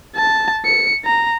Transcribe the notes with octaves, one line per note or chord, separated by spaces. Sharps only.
A5
C#7
A#5